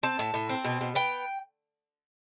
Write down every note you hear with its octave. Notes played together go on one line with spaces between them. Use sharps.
C4 A5
A2
A2
C4
B2
B2
B3 G5